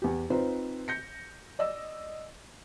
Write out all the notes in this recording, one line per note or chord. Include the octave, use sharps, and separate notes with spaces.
E2 G4
C4 D#4 F4 B4 C5
G6 A#6 C#7
D5 D#5 E6